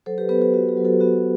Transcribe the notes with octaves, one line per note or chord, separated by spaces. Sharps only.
F#3 A4 C5
G4 B4
B3 G4 B4
G4
B3 F#4
G4
F#3
F#4 A4
B3 F#4